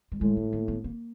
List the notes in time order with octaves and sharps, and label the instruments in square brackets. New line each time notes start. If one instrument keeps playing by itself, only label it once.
[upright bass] G3
[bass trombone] A2 [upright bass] G#3
[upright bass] A3
A#3
B3
A#3